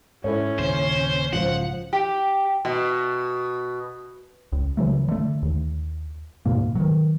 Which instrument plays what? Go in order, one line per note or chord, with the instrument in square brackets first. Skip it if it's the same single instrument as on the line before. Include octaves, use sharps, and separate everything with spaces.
[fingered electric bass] G#2 [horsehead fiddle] C#4 [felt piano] E4 A4 C#5
[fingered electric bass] D#2 A#2 C#3 [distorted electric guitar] C5
[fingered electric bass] B1 G#2 C#3 [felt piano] F3 C5 [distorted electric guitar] F#5
[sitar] G4
B2
[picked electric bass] C#2
C#3 E3 F#3 A3
D3 A3
D#2
D2 G#2 B2 A#3
D#3 F#3